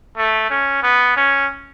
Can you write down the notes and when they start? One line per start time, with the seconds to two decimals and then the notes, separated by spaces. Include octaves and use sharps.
0.17 A3
0.50 C#4
0.83 B3
1.17 C#4